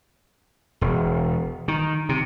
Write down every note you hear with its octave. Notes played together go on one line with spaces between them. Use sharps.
E1
D#3
C3